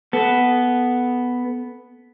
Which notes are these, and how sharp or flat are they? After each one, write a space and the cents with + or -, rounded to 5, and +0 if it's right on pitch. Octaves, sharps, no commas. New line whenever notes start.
B3 +0 A4 -20